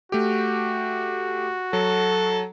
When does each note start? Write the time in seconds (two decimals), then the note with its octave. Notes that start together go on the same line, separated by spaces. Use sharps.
0.12 A3 F#4 G4
1.73 F#3 A4